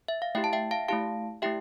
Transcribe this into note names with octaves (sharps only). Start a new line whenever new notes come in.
E5
F5
A3 E4 G4 E5 G5
A5
E5 G5
F5 A5
A3 E4 G4 F5 A5
A3 E4 G4 E5 G5